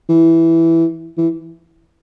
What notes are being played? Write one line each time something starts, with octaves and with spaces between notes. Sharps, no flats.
E3
E3